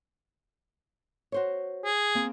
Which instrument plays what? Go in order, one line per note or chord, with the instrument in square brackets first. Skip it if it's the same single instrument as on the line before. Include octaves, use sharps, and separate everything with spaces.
[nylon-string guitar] F#4 C5 C#5
[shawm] G#4
[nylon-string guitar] A#3 C4